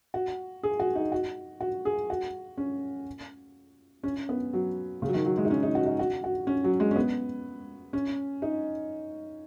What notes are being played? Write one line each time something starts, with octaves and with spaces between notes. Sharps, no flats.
F#4
G#4
F#4
D#4
F#4
F#4
G#4
F#4
C#4
C#4
B3
F#3
C#3
F#3
D#3
F#3
G#3
D#4
C#4
D#4
F#4
D#4
F#4
F#4
C#4
F#3
G#3
C#4
B3
C#4
D#4